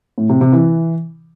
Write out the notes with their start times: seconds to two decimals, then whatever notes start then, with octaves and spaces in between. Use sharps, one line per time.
0.18 A2
0.29 C3
0.41 C3
0.53 E3